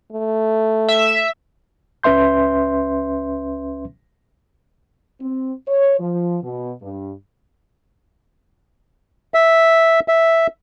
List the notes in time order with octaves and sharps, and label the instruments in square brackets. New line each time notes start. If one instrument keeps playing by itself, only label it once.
[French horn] A3
[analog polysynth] E5
[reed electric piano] C#2 C#4 B4 E5 C6 G6
[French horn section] C4
C#5
F3
B2
G2
[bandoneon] E5
E5